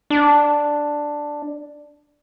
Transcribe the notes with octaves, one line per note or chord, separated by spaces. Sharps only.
D4